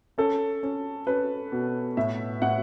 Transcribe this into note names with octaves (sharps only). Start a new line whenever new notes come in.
C#4 A4
C#4
C#4 B4
B2
A2 E5
A2 F#5